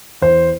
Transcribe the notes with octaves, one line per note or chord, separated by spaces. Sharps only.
E2 C5